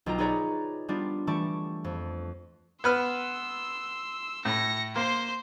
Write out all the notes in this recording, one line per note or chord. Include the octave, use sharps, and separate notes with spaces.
B1 F4 G5 A#5
D#4 G#4 B4 C#5 D5 A#5
G3 B3 D4 F4
E3 G3 A3 A5 C#6 D7
F2
B3 B4 C6 E6 F6
A2 A#6 C#7
A#3 C5 C6